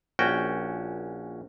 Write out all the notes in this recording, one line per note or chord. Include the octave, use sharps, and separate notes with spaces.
A#1 C#4 F#4 G5